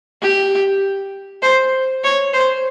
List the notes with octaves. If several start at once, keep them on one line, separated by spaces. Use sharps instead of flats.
G4
C5
C#5
C5